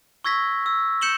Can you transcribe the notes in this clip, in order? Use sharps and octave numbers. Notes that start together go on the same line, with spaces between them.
C#6 E6 G#6 A#6 B6
E6
G6 C#7 E7 F#7 G7